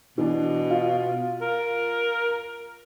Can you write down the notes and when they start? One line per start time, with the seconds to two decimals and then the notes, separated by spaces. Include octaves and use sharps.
0.18 B2 E3 D4
0.70 F4
1.41 A#4